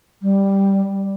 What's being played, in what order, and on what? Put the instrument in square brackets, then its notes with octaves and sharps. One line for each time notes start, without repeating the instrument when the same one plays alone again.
[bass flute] G3